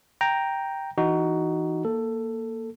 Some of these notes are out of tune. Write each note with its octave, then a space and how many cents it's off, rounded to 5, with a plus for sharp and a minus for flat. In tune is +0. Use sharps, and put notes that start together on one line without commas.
G5 +0 A#5 +0
E3 +0 D#4 +0 F#4 +15
A#3 +0 A4 +10